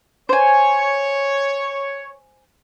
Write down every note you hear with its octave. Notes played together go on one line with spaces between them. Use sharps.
C5 C#5 G#5